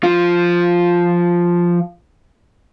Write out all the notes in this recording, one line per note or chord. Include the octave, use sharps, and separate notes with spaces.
F3 F4